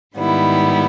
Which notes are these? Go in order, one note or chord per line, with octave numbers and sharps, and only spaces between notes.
G#2 D#3 G3 B3 E4